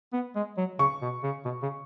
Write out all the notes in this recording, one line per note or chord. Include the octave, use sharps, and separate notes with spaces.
B3
G#3
F#3
C#3 C#6
B2
C#3
B2
C#3